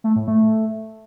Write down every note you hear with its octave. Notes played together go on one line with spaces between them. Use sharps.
A3
A2
A3